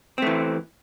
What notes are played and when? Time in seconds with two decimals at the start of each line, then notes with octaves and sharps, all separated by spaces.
0.18 C4
0.22 A3
0.27 E3